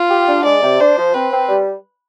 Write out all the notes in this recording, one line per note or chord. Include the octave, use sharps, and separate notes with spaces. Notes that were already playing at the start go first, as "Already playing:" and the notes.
Already playing: F4
G4
D4
G#3 D5
C3
D4 C5
F3
C4 B4
C4
G3